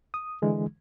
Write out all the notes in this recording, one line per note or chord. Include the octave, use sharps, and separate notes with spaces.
D#6
D3 E3 G#3